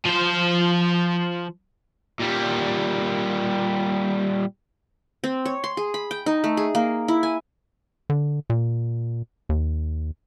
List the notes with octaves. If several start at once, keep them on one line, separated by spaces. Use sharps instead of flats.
F3 C5
A#2 G3
C4
C#5
C6
G#4
B5
G5
D#4
A3
G#4
A#3
E4
G#5
D3
A#2
D#2